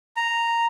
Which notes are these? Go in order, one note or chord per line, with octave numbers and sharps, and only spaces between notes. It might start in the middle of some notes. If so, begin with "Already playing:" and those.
A#5